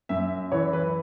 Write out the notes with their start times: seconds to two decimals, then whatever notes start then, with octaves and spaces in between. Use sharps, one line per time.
0.09 F#2 E5
0.52 E3 C#5
0.73 B4